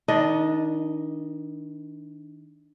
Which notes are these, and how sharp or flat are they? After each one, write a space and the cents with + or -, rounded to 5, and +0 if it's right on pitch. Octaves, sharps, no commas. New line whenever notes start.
D#3 +25 D4 +0 D#5 +0